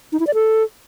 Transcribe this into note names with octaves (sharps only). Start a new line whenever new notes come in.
D#4
E4
D5
A4